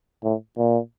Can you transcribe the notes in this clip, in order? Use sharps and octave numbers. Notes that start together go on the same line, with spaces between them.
A2
A#2